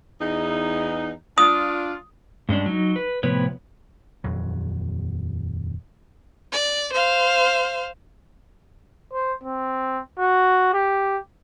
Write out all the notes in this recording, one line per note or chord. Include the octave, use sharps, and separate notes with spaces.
E2 D#4
D4 F4 D#6
G2 G#3 C#4 D4
F#3 D#4
B4
A2 C3 F3 B3 B4 C#5
D#1 F2 F#3
D5
C5 F5
C5
C4
F#4
G4